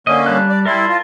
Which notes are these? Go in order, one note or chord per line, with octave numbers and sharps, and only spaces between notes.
D3 A#3 C#4 D#5
G3 A5 F#6
D5
G3 E4 A#4 A5 C6
F4